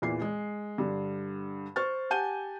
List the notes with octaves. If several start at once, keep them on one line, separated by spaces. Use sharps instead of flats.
E2 A#2 E3 C7
G#3
G2 D3
C5 C#6 F6 A6
G4 F#5 G#5 A5 G6 D#7